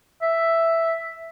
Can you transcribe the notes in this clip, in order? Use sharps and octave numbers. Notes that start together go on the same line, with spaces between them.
E5